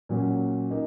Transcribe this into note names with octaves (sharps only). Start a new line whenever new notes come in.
A#2 F#3 A#3 C#4
A#3 D#4